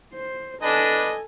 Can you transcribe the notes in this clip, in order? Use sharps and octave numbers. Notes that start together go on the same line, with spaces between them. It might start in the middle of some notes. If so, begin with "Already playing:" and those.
C5
D4 A4 B4 D#5 G#5